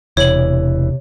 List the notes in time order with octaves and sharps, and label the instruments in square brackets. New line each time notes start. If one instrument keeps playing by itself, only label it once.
[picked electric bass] E1 E3 [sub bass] C3 [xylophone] C#5 F#7